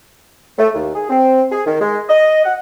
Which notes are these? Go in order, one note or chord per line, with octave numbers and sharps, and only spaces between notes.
A3
D#2
G#4
C4
G#4
D#3
G#3
D#5
F#5